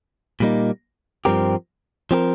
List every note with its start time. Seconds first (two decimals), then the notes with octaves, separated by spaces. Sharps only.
0.40 A#2 G3 A#3 D#4
1.25 G2 F3 C4 G4 A#4
2.11 F3 C4 G4 A#4